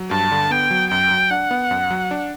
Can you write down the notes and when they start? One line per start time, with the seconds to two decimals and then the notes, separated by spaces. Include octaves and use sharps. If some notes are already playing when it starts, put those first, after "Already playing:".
Already playing: F#3
0.11 G2 A5
0.31 D3
0.51 B3 G5
0.71 F#3
0.91 F#2 G5
1.11 F#3
1.31 D4 F#5
1.51 B3
1.71 F#2
1.91 F#3
2.11 D4